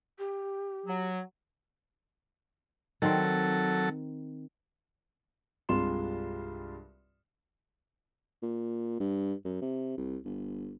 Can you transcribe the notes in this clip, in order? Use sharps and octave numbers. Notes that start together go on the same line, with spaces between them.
G4
F#3
D#3 F#3 C4 A4
C2 G2 G#3 F4 C6 E7
A#2
G2
F#2
C3
C2
G1